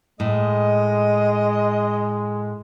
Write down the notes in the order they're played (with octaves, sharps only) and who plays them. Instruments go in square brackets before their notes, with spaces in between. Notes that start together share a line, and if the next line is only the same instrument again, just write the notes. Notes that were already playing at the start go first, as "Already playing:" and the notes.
[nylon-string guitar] A2 [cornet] G#3 [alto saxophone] D#5